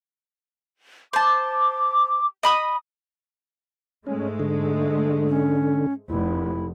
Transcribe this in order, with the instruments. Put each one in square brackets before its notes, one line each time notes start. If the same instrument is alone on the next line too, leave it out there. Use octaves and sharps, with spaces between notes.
[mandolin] C5 A5 [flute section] D6
[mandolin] D#5 B5 D#6
[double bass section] G#2 G#3 A3 [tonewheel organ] C#4
[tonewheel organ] D3
[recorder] C#4
[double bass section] F1 [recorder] E4